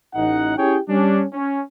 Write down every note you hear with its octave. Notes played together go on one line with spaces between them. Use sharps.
A1 D#4 F#5
C#4 E4 G4 G#4 C#5 G5
G3 C#4 D4
C#4